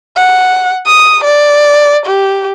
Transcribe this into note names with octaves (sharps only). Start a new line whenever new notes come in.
F#5
D#6
D5
G4